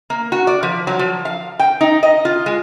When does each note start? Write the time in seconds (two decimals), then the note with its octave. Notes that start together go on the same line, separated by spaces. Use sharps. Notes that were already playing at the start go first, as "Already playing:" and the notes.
0.10 A#3
0.32 F#4
0.47 D5
0.63 F3
0.87 F#3
0.99 F3
1.25 F5
1.59 G5
1.81 D#4
2.03 D#5
2.25 F4
2.46 G#3